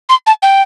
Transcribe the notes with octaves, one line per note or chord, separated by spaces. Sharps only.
C6
A5
G5